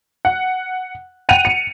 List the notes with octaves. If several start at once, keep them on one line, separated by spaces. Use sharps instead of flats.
F#5
F#5 G5 D#7 F7
C#7